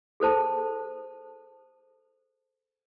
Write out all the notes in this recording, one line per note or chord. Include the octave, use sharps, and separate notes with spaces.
G#4 A4 C5 A5